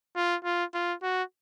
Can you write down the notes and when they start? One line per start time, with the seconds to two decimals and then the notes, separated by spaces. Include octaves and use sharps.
0.16 F4
0.44 F4
0.74 F4
1.03 F#4